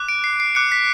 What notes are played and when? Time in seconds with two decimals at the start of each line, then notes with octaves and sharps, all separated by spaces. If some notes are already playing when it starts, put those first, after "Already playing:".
Already playing: D6 F#6
0.09 D7
0.24 C7
0.40 C7
0.55 D6 F#6 C#7
0.72 B6